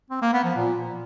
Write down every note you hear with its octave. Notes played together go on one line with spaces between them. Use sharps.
C4
A#3
B3
F3
A#2